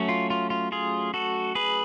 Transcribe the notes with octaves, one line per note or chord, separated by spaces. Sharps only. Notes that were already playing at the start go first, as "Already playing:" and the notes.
Already playing: F#3 A3 C#4
F4
F4
F4
F4 G#4
F#4 A4
G#4 B4